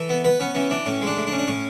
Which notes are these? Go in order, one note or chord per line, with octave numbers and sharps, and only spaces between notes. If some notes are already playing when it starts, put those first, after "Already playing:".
Already playing: E3 A4
B3
B3 B4
B3 C#4
E3 C#4
E3 D4
A2 C#4
G#3
D4
A2
D4
C#4
D4
A2 C#4